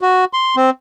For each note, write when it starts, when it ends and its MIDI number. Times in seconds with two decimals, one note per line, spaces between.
0.01 0.25 66
0.33 0.56 84
0.56 0.70 60